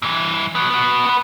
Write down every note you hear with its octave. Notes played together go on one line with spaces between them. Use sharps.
G2 E3
F#3 B3
B3 F#4
B3 B4